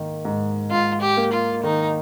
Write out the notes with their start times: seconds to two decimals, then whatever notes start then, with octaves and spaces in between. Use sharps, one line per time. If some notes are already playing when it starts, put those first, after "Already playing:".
Already playing: G#2 D#3 A#3
0.25 G#2
0.71 G#2 F4
1.02 G4
1.17 A#3
1.33 F4
1.63 D#3 D#4